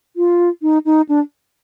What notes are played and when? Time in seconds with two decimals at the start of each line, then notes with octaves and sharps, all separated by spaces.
0.16 F4
0.62 D#4
0.85 D#4
1.09 D4